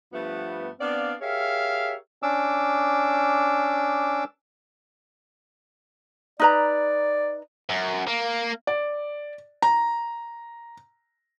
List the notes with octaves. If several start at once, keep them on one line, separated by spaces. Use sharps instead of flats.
G2 F3 A3 B3
B3 C4 D4 D5 F5
G4 G#4 A#4 C#5 E5 F5
C#4 D4 D6 E6
D#4 B4 D5 A#5
F#2
A#3
D5
A#5